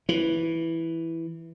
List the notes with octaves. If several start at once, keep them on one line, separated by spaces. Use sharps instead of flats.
E3